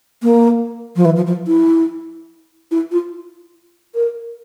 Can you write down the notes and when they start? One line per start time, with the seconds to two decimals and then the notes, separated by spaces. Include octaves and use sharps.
0.23 A#3
0.96 F3
1.05 E3
1.16 F3
1.27 F3
1.47 E4
2.71 E4
2.92 F4
3.95 A#4